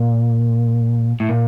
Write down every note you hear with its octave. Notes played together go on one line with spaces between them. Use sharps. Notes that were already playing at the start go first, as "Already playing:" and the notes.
Already playing: A#2
A2
A#2